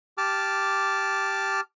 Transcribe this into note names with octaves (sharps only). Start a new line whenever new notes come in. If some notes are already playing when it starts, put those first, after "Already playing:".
G4 A5 D6 F6